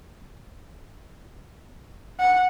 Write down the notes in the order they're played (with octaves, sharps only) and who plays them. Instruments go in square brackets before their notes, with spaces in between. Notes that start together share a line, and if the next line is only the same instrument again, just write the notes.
[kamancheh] F#5